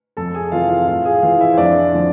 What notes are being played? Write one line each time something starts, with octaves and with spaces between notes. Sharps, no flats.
F2 A4 A5
G#4 G#5
C3 E3 F4 F5
F4 F5
A2 F4 F5
G#4 G#5
E3 F4 F5
E4 E5
C5
F2 D4 D5
D3 F3